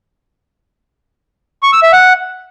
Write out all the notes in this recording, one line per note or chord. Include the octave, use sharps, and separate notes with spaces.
C#6
E6
E5
F#5